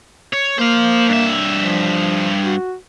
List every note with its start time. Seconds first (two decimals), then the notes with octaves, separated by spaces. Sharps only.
0.34 C#5
0.59 A#3 C5 F5
1.09 G2 E5
1.56 F3
2.43 F#4